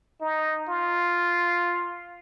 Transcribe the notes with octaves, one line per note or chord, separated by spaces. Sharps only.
D#4
F4